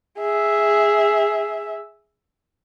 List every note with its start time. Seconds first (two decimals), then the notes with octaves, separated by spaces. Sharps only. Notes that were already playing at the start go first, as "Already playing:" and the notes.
0.19 G#4 E5